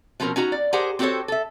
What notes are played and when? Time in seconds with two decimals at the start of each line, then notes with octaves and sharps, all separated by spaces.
0.20 B2 F3 C4 C#4 A#4
0.36 C#4 D#4 F#4 A#5
0.52 D5
0.73 G4 G#4 A#4 C5 F#5 G#5
0.99 C4 F#4 G4 A4 C5 C#5
1.28 A4 E5